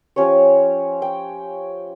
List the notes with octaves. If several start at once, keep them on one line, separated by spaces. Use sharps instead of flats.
F3 C#4 G4 C#5
G5